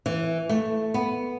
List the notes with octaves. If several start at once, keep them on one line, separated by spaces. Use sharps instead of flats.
E3
A3
B3